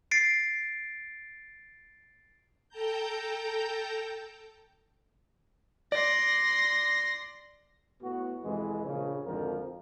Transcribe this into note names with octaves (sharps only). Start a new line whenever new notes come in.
A6 C7 D7
A4 G5 A5 A#5 G6
D5 C6 A#6
A2 B3 F#4
C2 F2 E3 G#3
A#1 C#3
G#1 F2 D3 F3 A#4